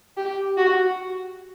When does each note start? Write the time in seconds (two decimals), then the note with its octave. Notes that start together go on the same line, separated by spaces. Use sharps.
0.17 G4
0.57 F#4